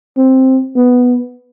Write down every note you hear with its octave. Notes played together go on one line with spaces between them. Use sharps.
C4
B3